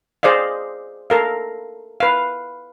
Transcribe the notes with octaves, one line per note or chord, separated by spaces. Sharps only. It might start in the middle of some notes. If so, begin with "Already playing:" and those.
G#4 C5 D5 D#5 F5
A4 A#4 F5
B4 F5